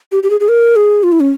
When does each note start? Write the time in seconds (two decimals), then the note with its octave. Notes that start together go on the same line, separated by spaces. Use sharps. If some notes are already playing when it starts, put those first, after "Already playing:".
0.12 G4
0.23 G4
0.30 G#4
0.40 G#4
0.49 A#4
0.76 G#4
1.03 F4
1.12 E4
1.20 C#4